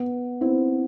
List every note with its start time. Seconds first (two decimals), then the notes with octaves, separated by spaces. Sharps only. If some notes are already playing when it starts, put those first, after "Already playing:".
Already playing: B3
0.41 C4 E4